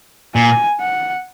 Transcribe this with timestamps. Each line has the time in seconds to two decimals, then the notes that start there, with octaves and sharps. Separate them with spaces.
0.35 A#2 G#5
0.81 F#5